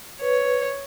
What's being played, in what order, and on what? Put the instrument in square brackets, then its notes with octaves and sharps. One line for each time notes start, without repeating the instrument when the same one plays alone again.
[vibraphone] B4 [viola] C#5